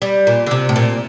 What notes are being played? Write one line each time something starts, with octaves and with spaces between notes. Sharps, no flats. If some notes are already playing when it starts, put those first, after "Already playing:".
G3
A#2
D3
C3
A2
A#2